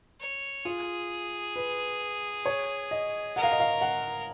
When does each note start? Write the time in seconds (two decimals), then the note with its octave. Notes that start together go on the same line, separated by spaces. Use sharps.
0.21 C#5
0.65 F4 G#4
1.56 B4
2.46 C#5
2.91 D#5
3.36 A#4 F#5
3.43 F5
3.52 D#5
3.60 F5
3.81 F#5